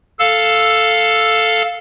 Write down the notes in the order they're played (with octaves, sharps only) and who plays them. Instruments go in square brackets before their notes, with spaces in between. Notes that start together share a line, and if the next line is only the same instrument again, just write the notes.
[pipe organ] A4 F5 E6